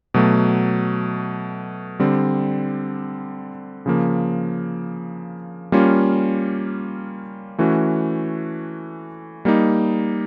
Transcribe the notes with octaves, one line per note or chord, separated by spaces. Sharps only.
B2 F#3 A3
D3 G3 C4
C#3 F3 A#3
G3 A#3 C#4 F4
E3 A3 C#4 F#4
G3 A#3 D#4